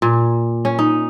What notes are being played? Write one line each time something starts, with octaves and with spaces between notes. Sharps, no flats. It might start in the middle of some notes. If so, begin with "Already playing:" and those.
A#2
C#4
D#4